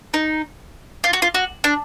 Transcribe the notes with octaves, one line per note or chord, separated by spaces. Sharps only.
D#4
F4
F#4
F4
F#4
D4